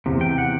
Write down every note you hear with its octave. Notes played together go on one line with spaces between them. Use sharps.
E2 C3
G5
F#5